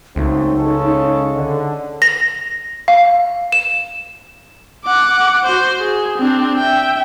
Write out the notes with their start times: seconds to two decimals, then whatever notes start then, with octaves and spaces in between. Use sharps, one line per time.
0.16 C#2 F#3 A3 C4 D#4
0.57 C#3 G#3 C#4 A4
1.36 D3
2.02 A#6
2.88 F5
3.52 E7
4.85 F#5 D6
5.45 F#4 C5
5.81 G#4
6.18 C4 D4
6.56 E5 G5